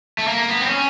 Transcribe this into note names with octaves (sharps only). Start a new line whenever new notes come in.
A3
A#3
B3
C4
C#4